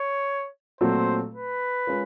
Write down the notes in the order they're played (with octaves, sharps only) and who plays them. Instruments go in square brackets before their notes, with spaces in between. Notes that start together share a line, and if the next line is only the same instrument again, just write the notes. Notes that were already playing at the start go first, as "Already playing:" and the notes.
Already playing: [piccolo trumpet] C#5
[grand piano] A#2 F#3 A3 C4 [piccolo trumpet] C5
[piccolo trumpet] B4
[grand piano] G#3 C#4 F4 A#4